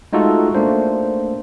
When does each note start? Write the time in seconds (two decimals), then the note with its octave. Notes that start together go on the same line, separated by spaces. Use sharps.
0.13 G#3 A3 D#4 F4 F#4 A4
0.55 A3 A#3 D4 C5